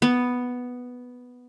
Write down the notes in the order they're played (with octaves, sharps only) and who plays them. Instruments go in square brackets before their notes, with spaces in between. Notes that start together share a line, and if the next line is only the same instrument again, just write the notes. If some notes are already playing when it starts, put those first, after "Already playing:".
[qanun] B3